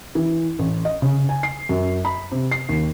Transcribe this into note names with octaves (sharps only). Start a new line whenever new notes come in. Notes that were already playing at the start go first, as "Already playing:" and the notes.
E3
A1
D#5
C#3
G#5
C7
F#2
B5
C3
C7
D#2